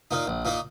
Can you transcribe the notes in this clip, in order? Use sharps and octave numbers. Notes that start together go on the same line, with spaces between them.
A#2 A#3 D#4
A#1
A#2 A#3 D#4